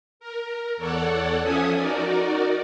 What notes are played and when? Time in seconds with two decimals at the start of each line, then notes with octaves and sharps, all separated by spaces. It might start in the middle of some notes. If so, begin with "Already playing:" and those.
0.20 A#4
0.77 E2 A4 C#5 D5 F#5
1.42 F3 C#4 A4 E5 G#5 D#6
1.77 D#4 F#4 A#4 D5